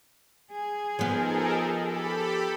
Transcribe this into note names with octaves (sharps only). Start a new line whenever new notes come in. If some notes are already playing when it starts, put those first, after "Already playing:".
G#4
F3 B3 D#4 A4 A#4
G4 A4 B5